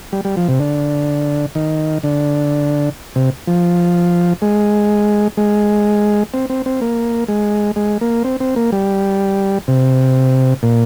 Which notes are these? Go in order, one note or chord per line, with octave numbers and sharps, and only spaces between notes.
G3
G3
F3
C3
D3
D#3
D3
C3
F3
G#3
G#3
C4
C4
C4
A#3
G#3
G#3
A#3
C4
C4
A#3
G3
C3
A#2